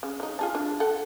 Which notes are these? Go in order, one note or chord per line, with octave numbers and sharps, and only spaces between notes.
C#3
F#3 D#4
F4 G#4 A5
D4
A4 F#5 G5